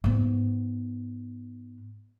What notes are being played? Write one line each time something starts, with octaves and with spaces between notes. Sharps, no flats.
G#2 B3